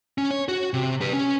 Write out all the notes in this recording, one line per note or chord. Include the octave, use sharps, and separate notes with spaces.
C#4
C#5
F#4
C3
G4 B4
C#4